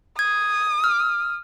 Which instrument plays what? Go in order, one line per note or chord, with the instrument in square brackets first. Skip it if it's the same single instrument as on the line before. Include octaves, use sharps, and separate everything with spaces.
[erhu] D#6 [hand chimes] G#6
[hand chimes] F6